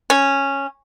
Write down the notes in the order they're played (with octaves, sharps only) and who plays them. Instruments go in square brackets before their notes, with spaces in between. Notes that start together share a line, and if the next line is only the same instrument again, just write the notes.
[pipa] C#4